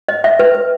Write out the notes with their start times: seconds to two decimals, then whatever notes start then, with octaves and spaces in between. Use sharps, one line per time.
0.09 D#5
0.24 E5
0.39 B4
0.55 B4